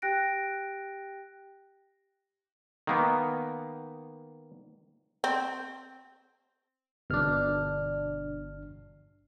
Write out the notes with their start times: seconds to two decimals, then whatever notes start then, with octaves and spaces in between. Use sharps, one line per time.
0.02 G4 G5 F#6 A#6 D7
2.87 D#3 A#3 B3
5.24 C4
7.10 G1 B2 D4 F6